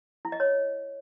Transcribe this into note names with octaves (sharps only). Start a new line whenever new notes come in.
E4
D#5
C#5